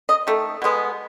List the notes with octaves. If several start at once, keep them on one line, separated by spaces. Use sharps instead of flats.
D#5
D#3 A3
B2 G#3 B3